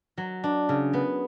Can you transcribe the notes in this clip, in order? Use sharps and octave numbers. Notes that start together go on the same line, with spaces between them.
F#3
D4
C#3
B3